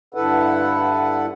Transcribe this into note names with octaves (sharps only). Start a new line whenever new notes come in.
G2 D3 E4 A4 B4 F#5